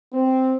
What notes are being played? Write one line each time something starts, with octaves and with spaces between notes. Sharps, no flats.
C4